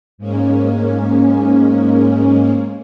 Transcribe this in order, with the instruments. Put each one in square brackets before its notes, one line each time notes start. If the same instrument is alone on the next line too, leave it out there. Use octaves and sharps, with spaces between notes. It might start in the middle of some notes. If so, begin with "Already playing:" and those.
[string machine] G#2 G#3 A#3 C#4